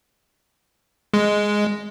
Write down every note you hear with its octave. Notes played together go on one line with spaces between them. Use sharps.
G#3